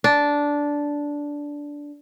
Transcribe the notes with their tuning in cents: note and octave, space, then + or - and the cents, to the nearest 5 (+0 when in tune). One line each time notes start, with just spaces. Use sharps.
D4 -10